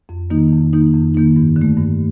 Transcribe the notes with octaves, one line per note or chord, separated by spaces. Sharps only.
F2
D#3 A#3 D#4
F2
D#3 A#3 D#4
F2
D#3 A#3 D#4
G2
D3
A3
G2